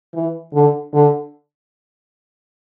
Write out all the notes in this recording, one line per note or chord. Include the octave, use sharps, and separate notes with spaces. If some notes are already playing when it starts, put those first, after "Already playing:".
E3
D3
D3